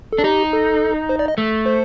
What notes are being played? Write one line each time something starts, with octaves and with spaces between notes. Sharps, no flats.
A4
D4
D#4 G4
A4
C5
D5
D#5
A3
C5